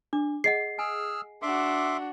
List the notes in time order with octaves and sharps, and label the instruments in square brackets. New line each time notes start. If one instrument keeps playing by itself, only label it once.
[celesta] D4 [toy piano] D6
[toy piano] G#4 D#5 F#5 [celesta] C7
[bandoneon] G#4 E6 F6 [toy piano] G#5
[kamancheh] D4 F#4 [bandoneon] E5 C6 D6